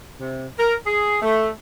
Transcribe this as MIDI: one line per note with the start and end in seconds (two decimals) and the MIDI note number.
0.19 0.46 48
0.58 0.75 70
0.85 1.16 68
1.22 1.48 57